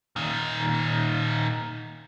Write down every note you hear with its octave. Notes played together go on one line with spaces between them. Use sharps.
A#2 D#3